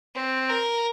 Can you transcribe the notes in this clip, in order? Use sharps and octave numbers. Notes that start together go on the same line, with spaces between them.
C4
A#4